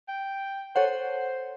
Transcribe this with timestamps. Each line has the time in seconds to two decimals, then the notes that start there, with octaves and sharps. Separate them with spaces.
0.09 G5
0.76 A4 C5 C#5 F#5